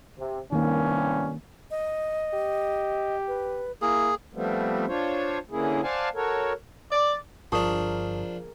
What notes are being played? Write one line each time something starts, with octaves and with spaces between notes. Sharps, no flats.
C3
C2 G2 D#3 A#3 C#4
D#5
G4
B4
A#3 E4 G#4
F3 G3 A3 B3 C4
D4 F4 C5 C#5
D3 E3 A#3 C#4 E4 G#4
C5 D5 F5 F#5 G#5 A5
F#4 A4 A#4 C#5
D5
G1 F3 D4 G#4 A#4 A5 C#6 D#6